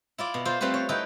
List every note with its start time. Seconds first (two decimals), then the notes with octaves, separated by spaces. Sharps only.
0.18 E4 F4 D5
0.34 B2
0.45 F4 A4 C5
0.60 G3 A3 C4 F4 B4 C5
0.74 C#5
0.89 D#4 E4 A4 B4 G5